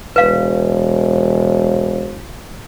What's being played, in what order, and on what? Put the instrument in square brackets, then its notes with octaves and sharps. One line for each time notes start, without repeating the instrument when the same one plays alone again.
[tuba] E1 [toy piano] B4 F5